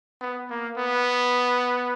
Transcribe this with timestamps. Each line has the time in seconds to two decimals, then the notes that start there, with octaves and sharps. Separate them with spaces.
0.21 B3
0.50 A#3
0.77 B3